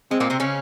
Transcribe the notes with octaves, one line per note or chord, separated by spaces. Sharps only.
G#3 C4
A#2 A#3
C3 C4
C#3 C#4